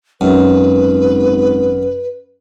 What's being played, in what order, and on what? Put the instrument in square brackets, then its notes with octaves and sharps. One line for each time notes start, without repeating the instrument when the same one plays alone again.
[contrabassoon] G#1 [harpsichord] F#2 [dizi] B4